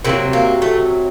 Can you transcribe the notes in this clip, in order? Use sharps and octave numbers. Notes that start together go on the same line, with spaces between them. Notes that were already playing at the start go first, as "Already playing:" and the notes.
C3 D#3 F#3 A#3
A#3
A3